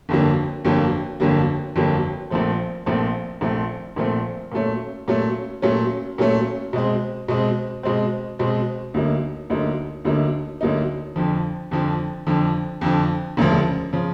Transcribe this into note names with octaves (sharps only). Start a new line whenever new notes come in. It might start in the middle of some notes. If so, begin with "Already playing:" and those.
G1 F2 D3 F#3 A#3
G1 F2 D3 F#3 A#3
G1 F2 D3 F#3 A#3
G1 F2 D3 F#3 A#3
A#1 A#2 F3 A3 C4
A#1 A#2 F3 A3 C4
A#1 A#2 F3 A3 C4
A#1 A#2 F3 A3 C4
A#2 F#3 A3 C#4
A#2 F#3 A3 C#4
A#2 F#3 A3 C#4
A#2 F#3 A3 C#4
B2 G#3 C4
B2 G#3 C4
B2 G#3 C4
B2 G#3 C4
D2 D3 F#3 A#3 D#4
D2 D3 F#3 A#3 D#4
D2 D3 F#3 A#3 D#4
D2 D3 F#3 A#3 D#4
F2 D3 F3
F2 D3 F3
F2 D3 F3
F2 D3 F3
E1 D2 C#3 F3
C#3 F3